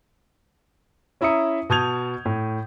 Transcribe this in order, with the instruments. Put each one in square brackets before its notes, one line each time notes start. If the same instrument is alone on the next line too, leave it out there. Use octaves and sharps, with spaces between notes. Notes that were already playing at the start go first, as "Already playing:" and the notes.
[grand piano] C#4 E4 E5 A#5 D#6 C#7
B2 A5 D#6 G6 G#6 F7
A2